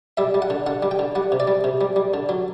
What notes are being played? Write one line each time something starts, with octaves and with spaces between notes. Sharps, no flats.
G3 E5
G3
F#5
D3
D3 F#5
G3
G5
D3
G3 F#5
C3
D5
G3
C3
G3
G3
D3
F#3